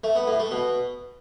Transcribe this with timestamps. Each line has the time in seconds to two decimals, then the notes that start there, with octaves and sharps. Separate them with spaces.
0.04 A3
0.15 B3
0.27 A2
0.39 A3
0.51 B2